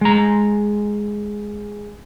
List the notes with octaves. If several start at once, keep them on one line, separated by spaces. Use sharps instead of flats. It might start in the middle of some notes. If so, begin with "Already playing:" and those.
G#3 A#5